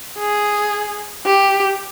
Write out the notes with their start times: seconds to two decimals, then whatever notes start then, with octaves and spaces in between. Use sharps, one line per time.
0.19 G#4
1.26 G4